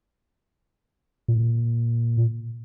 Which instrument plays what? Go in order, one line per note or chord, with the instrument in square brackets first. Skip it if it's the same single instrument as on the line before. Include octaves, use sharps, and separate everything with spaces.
[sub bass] A#2